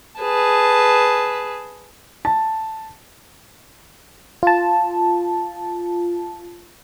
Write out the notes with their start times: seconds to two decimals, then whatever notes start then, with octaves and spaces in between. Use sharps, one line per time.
0.19 G#4 B4 A5
2.25 A5
4.43 F4 A5